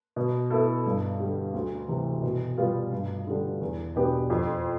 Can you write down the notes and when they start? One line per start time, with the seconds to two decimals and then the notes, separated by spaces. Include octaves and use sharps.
0.16 B2
0.50 B3 E4 A4
0.86 G2
1.20 D3 G3
1.54 D2
1.88 C3 E3
2.23 B2
2.58 G3 B3 F4
2.92 G2
3.27 D3 G3 D4
3.61 E2
3.96 B2 B3 D4 G4
4.30 F2